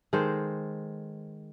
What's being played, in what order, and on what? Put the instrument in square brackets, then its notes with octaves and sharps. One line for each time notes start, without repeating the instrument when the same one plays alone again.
[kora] D#3 G#3 A4 C5